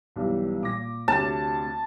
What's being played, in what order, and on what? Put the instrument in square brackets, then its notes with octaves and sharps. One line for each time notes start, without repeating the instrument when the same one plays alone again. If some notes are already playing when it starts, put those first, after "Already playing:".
[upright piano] B1 E3 G3
A#2 D6 A#6
[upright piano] D2 C3 [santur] A5